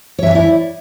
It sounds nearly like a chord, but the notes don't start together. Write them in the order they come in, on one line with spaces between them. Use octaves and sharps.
C#5 E5 G#5 D5 E4